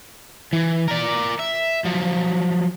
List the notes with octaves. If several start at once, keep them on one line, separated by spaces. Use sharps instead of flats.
E3
A#4 D5
E5
F3 F#3